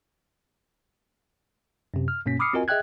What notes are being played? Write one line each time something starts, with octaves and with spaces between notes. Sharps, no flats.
F#2 C3
F6
G2 B2 A#3 C#4 B6
B5 D6 D#6 F6 C7 C#7
C4 F4 F#4 A#4 D#5 G#5
G#4 D#5 E5 G5 F#6 G#6